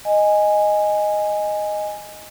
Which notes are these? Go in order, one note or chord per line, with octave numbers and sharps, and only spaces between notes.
D#5 G#5